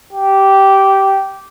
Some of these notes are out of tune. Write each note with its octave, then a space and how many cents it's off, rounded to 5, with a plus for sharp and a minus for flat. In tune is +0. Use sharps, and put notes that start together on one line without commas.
G4 -10